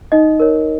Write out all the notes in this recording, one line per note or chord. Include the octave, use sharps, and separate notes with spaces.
D#4 D#5
A#4 C#5